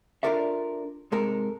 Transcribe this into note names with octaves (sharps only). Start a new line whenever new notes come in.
D4 F4 A4 A#4 D5 E5
G#2 C3 G#3 A4 A#4 A#5